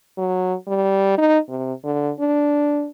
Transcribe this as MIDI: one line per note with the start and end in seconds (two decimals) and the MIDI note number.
0.18 0.54 54
0.67 1.17 55
1.18 1.38 63
1.49 1.73 48
1.84 2.11 50
2.19 2.87 62